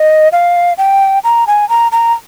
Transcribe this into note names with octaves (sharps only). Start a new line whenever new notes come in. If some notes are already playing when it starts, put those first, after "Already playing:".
Already playing: D#5
F5
G5
A#5
G#5
A#5
A#5